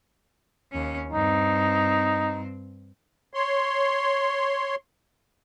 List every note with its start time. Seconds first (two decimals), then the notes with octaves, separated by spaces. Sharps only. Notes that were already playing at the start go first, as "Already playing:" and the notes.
0.72 D#2 C#4
1.12 G2 C4 D#4
3.34 C#5 C6